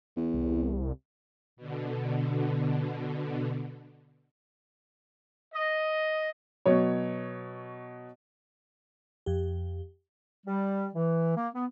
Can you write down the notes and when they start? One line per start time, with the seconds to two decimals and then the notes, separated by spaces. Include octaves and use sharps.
0.17 E2
0.34 C2
1.57 B2 D3
5.54 D#5
6.66 B2 F#3 C#5
9.26 F2 G4
10.47 G3
10.94 E3
11.36 A#3
11.54 B3